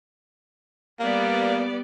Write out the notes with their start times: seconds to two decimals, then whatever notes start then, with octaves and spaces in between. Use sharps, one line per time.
1.00 G3 A#3 B3 D5